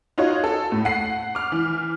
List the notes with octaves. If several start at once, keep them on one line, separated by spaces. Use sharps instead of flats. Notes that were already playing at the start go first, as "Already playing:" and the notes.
D#4 F4 F#4 C#5
A4
A2
F#5 C7
D6 F6
E3